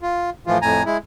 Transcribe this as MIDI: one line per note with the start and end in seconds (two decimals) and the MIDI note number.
0.02 0.30 65
0.47 0.58 45
0.47 0.58 52
0.47 0.58 53
0.47 0.58 65
0.62 0.83 41
0.62 0.83 45
0.62 0.83 80
0.62 0.83 82
0.86 0.97 56
0.86 0.97 64